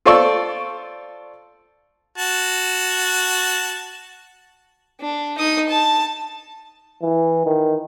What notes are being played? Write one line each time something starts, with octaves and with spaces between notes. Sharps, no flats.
F4 A4 C5 D5 C#6 E6
F#4 A5
D4
D#4 D#6
A5
E3
D#3